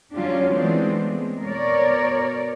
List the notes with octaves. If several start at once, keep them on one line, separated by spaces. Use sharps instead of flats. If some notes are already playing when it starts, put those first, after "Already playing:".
D3 F#3 C#4 D4 F4 G4
E3 G#3 A3 B3 C4 D4
G#3
B2 A#4 C#5 D5